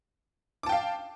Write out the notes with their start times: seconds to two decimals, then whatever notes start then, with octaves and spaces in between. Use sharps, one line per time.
0.63 D6
0.66 A5
0.69 G5
0.72 F5